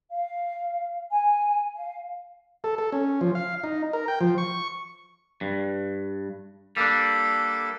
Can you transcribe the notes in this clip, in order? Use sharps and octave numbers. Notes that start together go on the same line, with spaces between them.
F5
G#5
F5
A4
A4
C#4
F3
F5
D#4
A#4
G5
F3
C#6
G2
G3 A#3 D4 A4